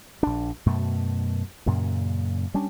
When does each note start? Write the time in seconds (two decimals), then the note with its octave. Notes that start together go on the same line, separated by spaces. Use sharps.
0.23 A#1 D4
0.66 F#2 B2 A3
1.66 F#2 A#2 C#3
2.54 G3 C#4 D4